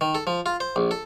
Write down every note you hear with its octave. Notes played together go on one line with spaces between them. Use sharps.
D#3
A4
F3
F4
C5
A#1
A4